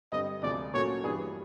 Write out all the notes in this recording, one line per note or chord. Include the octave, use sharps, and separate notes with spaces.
G2 D3 G3 C4 D#5
D2 C3 F3 G#3 D5
A#2 F#3 A3 C#4 F#4 C#5
G2 E3 G3 G#4